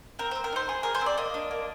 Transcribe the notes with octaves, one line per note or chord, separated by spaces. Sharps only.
C4 A#4
C5
C4
A#4
D#4 C5
G#4
G#4 A#4
C5
C4
D5
A#3 D#5
D4
A#3